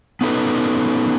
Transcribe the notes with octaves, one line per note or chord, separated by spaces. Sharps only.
B3 C#4 D#4 A4 B4